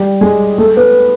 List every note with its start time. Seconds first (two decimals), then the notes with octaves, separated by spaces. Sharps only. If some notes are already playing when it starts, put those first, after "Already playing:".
Already playing: G3 G4
0.21 G#3 G#4
0.58 A3 A4
0.77 B3 B4